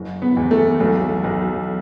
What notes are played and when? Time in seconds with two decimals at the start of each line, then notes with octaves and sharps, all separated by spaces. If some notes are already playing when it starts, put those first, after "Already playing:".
Already playing: F#1
0.22 B3
0.37 E2
0.51 A3
0.80 B1 A3
1.24 B1